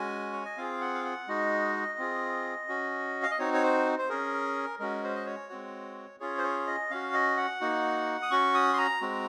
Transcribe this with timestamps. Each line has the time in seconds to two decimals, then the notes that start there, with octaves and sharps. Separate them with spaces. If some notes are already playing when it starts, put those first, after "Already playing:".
Already playing: G#3 C#4 F#4 G#5
0.33 C#5
0.45 D#5
0.57 C4 F4 G#4 F5
0.81 F#5
0.95 F5
1.05 F#5
1.28 G#3 D#4 F#4 D#5
1.98 C4 F4 G#4
2.69 C#4 F#4
3.23 F5
3.31 D#5
3.39 C4 D#4 F#4 C#5
3.54 C#5
3.63 C5
3.99 C5
4.09 C#4 G#4 A#4
4.79 G#3 C#4 F#4 A#4
5.03 C5
5.15 D#5
5.26 C#5
5.49 G#3 C4 F#4
6.20 C#4 F4 G#4 C#5
6.38 C5
6.43 C#5
6.67 D#5
6.90 C#4 F#4 F5
7.14 D#5
7.37 F#5
7.61 A#3 D#4 F#4
8.22 D#6
8.31 C#4 F#4 C#6
8.54 D#6
8.73 C6
8.78 A#5
9.02 G#3 C4 F#4